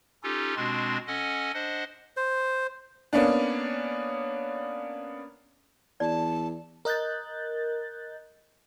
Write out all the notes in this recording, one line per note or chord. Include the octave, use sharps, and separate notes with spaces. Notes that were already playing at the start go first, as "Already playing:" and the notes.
C#4 D#4 F4 G4 A4
B2 G#3 C4 D4 F#4 C6
C#4 A4 D#5 F#5 G#5
D4 C5 D#5 F#5
C5
A#3 B3 C#4 D4
E2 D5 A5
A#4 D#5 F#6 G6 A6